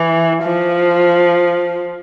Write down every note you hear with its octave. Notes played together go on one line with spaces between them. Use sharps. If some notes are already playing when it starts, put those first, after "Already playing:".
Already playing: E3
F3